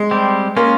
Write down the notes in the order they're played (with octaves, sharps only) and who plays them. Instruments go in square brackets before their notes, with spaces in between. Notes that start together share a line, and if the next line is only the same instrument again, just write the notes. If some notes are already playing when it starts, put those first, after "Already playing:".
Already playing: [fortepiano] G#3
[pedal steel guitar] G3 C4 G4
[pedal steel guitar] G#3 C#4 F4 [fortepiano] A#3